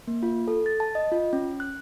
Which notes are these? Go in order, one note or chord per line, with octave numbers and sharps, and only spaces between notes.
A#3
F4
A4
A6
A5
D#5
F4
C#4
F#6